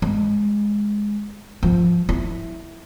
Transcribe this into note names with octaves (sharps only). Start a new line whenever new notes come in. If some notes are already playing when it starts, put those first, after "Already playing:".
G#3
F3
E4